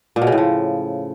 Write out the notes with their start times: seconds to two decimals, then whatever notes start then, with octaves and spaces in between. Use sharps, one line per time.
0.16 A#2
0.22 B2
0.27 C#3
0.32 A2
0.38 F3